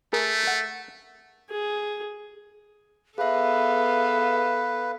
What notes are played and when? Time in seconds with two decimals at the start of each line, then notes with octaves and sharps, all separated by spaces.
0.13 A3 G#4 A#4
0.47 F#5
1.50 G#4
3.18 B3 G#4 A4 B4 E5 F5